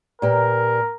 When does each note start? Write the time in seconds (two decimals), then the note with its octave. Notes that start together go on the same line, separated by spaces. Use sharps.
0.22 A#2 G4 A#4 B4